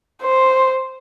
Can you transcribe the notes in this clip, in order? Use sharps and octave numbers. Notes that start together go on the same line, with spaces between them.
C5